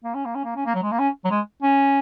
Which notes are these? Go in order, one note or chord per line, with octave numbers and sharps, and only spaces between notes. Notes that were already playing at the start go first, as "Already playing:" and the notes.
A#3
C#4
A#3
C#4
A#3
C#4
A#3
F#3
G#3
A#3
C#4
F#3
G#3
C#4